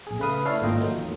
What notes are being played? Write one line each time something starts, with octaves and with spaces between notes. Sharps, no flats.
A#1 G#4
C#3 A3 B4 F5 D#6
D4 E4 A4 C#5 F5
G#1 A#2 D#4 F4 D#5 G5
F#3 A3 A#3 D#4
E2